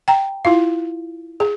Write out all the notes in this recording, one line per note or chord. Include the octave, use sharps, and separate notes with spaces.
G5 A#5
E4 F4 F5
G#4